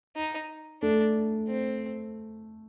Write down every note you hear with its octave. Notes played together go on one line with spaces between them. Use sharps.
D#4
A3 D4
C4